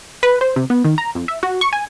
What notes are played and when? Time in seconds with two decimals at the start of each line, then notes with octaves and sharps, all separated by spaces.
0.23 B4
0.41 C5
0.56 C3
0.70 B3
0.85 D#3
0.98 A#5
1.15 F2
1.28 E5
1.43 F#4
1.61 C#6
1.73 G#5